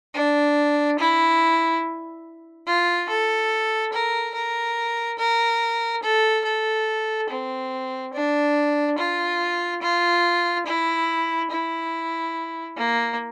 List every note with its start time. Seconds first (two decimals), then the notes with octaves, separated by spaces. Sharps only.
0.14 D4
0.99 E4
2.67 F4
3.09 A4
3.93 A#4
4.35 A#4
5.19 A#4
6.03 A4
6.45 A4
7.29 C4
8.14 D4
8.98 F4
9.82 F4
10.66 E4
11.51 E4
12.77 A#3